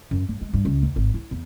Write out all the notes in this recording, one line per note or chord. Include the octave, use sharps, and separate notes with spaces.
F#2
G2
G#3
G2
C#2
D#2
G#1
E4
E2